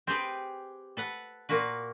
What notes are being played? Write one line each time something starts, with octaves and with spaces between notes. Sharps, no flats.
C4 G4 G#4 B4
A4 B4 F#5
A#2 A#3 F#4 B4